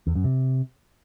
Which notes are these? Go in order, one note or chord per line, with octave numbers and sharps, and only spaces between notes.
E2
F#2
C3